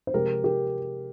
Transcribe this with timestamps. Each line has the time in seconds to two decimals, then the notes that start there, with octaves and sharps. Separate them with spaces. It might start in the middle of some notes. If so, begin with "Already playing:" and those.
0.07 C5
0.14 C3 F3 G#3 G4 A#4
0.44 G4 A#4